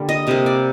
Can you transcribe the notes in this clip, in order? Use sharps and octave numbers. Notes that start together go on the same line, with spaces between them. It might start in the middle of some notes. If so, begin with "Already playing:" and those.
Already playing: D3 G3 A#3
D#5
C3 G3 A#3 D#5
D5